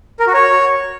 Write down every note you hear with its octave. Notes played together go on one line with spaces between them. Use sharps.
A#4
F#4
C#5